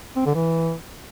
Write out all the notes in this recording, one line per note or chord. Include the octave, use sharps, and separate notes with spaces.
C4
D3
E3